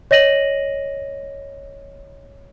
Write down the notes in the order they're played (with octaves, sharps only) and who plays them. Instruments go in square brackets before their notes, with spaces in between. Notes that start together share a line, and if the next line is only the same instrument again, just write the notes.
[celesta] C#5 D#5 A#6 D#7 F#7